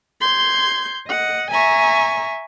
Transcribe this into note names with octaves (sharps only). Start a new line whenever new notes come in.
C6 G6 G#6
D#5 F#5
E5 G#5 A#5 C#6